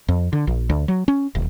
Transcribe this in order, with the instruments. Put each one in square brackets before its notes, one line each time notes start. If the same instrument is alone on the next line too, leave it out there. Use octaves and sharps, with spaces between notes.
[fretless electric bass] F2
D3
A#1
D2
F#3
C#4
D#1